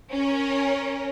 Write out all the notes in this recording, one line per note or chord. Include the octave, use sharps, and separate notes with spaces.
C#4 A#4